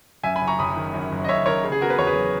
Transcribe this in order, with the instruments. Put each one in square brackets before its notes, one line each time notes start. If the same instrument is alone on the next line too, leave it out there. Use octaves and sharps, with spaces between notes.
[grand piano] F#2 E5 G#5
G#5 B5
F#1
A#5 C#6
F#1 B5 D#6
D#3
F#2
F#1
D#5
F#1 C#5 E5
D#3 A#4 C#5
C#3
G#4
B3 F#4 A#4
B4
E2 C#5
G#4 B4
F#3